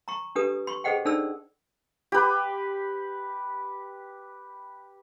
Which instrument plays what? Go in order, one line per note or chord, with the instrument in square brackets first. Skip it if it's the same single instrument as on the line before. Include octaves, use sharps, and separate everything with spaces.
[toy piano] A#5 C#6
D4 G4 A4 B4 D#6
C6 C#6
G#4 A4 C5 D#5 F#5 G5
D4 D#4 A4 C5 D5 E6
[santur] G4 B4